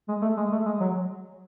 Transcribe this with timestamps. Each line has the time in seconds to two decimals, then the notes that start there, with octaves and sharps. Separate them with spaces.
0.08 G#3
0.22 A3
0.37 G#3
0.52 A3
0.66 G#3
0.80 F#3